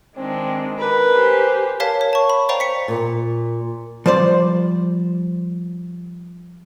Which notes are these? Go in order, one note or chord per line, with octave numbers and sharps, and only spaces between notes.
D#3 G#3 C4 D4
A#4 B4
G4 C5 G#5
A#4 C#5 F5 A5 B6
C#5
A5 C#6
B5
C5 D5 F5 G5 A#5 C#6
B6 C#7
A#2
F3 G3 C5 D5